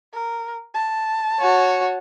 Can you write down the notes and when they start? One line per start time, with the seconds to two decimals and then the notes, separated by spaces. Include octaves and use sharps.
0.13 A#4
0.74 A5
1.39 F#4 C#5